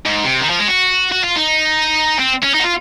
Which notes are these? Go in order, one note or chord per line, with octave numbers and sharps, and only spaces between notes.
G#2
C3
D#3
F3
G#3
F#4
F#4
F4
D#4
C4
C#4
D#4
F#4
F4